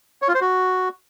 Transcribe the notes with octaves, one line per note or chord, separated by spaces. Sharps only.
C#5
F4
C5
F#4